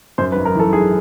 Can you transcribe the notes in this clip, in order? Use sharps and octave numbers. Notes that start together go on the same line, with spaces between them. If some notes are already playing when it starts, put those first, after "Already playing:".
F#2 C5
B4
G#1
A#4
E3 A4
G#1 G#4